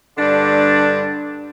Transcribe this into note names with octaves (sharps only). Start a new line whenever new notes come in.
G2 D3 D4